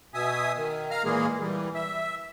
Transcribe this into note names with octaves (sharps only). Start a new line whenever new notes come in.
B2 E5 G#5 D#6
D#3
F5 A#5 F6
A#2 E3 G#3 A#3 G#4
E3 G3
E5